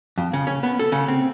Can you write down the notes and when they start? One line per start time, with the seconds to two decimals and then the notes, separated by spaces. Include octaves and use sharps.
0.18 F2
0.33 C#3
0.47 C#4
0.63 B3
0.79 A4
0.92 C#3
1.08 C4